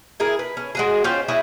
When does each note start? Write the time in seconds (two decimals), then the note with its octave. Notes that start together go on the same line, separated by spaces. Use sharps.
0.20 E4 G#4 A#4
0.39 B4
0.57 C#4
0.75 G#3 F#4 G#4
1.04 C#4 F4 C5 G5
1.28 E4 F#4 G#4